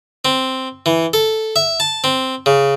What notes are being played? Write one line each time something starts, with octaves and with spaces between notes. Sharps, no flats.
C4
E3
A4
E5
A5
C4
C#3